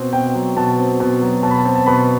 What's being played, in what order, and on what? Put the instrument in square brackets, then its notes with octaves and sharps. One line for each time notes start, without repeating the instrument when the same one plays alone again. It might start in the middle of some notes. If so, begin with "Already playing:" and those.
Already playing: [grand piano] B2 C4
B2 G5
F#3
B2 A5
C4
B2
F#3
B2 A5
B5
A5
C4
A5
B2 B5